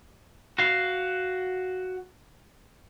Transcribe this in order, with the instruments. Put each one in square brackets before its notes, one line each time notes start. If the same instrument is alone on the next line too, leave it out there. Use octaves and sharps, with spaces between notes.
[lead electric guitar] F#4 F5